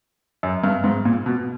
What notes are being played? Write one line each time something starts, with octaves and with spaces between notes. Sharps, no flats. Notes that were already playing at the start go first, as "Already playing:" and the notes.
F#2
G2
G#2
A#2
B2